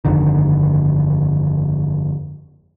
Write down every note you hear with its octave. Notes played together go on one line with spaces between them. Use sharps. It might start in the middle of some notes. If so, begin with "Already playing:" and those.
G1 F2 D3 D#3